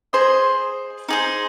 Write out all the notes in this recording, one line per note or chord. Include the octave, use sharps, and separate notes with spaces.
G#4 C5 D#5
D#4 G#4 C5